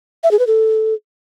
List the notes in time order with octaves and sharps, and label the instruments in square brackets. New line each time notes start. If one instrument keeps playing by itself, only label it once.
[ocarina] E5
G#4
B4
A4